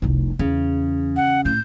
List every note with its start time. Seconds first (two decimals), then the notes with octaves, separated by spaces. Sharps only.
0.02 F1 C2
0.39 E2 C#3
1.16 F#5
1.45 A2 G6